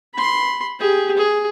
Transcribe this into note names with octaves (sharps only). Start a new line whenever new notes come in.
B5 C6
G4 G#4
G#4